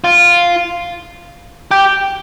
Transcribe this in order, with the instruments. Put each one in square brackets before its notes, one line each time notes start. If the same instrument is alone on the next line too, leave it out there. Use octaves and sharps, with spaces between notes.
[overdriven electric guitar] F4
G4